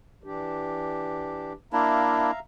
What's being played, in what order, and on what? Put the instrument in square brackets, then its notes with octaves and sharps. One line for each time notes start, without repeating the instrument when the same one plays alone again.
[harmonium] E3 D4 G4
[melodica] A#3 D4 E4 [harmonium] E5 F5 A#5